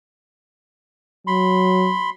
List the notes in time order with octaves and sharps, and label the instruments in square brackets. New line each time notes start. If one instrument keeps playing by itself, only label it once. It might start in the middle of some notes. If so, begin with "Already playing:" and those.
[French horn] F#3 [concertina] B5 C6